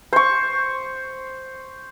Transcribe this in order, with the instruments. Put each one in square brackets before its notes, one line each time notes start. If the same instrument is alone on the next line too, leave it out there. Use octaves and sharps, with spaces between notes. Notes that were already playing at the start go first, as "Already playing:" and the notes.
[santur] C5 C#6